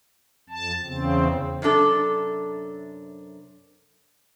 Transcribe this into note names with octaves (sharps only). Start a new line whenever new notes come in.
F2 A5
E2 C#3 C4
F#2 C3 D4 A4